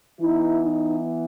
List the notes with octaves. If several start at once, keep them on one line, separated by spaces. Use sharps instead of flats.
E3 B3 D#4 E4
D#4